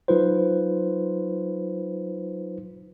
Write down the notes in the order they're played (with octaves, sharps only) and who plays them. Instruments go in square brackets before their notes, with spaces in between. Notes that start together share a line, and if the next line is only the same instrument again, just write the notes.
[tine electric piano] F#3 D#4 F4 B4 C5